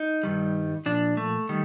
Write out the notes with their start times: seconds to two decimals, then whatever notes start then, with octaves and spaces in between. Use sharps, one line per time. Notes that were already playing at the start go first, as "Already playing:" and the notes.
Already playing: D#4
0.23 G2 D#3 G3
0.86 A#2 F3 D4
1.17 A3
1.49 D#3 G3